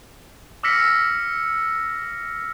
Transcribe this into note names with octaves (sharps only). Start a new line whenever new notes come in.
D6 E6 F6 A#6 B6 C#7